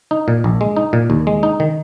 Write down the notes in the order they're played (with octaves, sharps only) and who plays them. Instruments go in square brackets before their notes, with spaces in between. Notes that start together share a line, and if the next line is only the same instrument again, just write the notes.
[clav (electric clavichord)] D#4
A#2
A#1
G#3
D#4
A#2
D#2
G#3
D#4
D#3